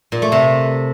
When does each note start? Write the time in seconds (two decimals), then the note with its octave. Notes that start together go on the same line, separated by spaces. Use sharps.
0.12 A#2
0.22 A3
0.32 C3